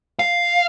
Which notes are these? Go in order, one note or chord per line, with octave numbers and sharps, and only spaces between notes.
F5